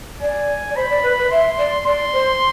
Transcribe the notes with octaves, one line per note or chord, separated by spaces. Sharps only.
D5 G#5
D5
C5 B5
D5
B4
B4
E5 C6
D5
D5 C6
C5